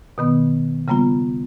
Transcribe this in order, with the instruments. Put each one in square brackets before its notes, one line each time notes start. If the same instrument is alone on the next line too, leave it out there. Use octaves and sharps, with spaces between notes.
[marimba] B2 D#3 B3
C#3 G3 A#3 B3 F4